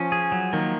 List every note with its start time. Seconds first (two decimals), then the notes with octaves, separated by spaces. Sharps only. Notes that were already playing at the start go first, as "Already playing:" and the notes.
Already playing: F3 C#4
0.12 G#4
0.32 F#3
0.53 D#3 A#3